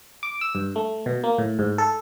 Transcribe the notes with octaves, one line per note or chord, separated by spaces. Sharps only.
D6
E6
G2
A3
B2
A#3
A2
G#2
A4